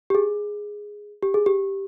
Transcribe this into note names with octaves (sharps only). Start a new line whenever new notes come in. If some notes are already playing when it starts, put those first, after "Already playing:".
G4
G#4
G4
G#4
G4